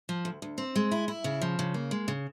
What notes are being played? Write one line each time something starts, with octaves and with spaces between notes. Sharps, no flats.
F3
D2
D2
C4
G#3
E4
E4
C#3
F3
C#3
A#3
G#3
C#3